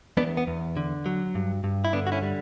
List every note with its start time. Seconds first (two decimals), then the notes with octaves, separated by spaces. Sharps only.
0.17 E2 B3 D4
0.37 B3
0.47 E2
0.77 D3
1.06 F#3
1.35 G2
1.64 G2
1.85 E4
1.93 D3 B3 D4
2.07 F#4
2.12 C#4 E4
2.22 G3